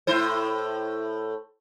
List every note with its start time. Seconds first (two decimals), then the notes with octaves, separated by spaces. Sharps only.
0.07 A2 E4 C5